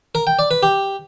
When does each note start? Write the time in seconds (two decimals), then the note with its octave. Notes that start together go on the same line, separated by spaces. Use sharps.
0.15 A#4
0.27 G5
0.39 D5
0.51 B4
0.63 G4